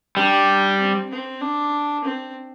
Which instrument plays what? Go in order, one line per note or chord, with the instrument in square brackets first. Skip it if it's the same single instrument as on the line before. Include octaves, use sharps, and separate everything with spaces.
[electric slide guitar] G3 [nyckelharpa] D4
[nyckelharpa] C4
C4
D4
C4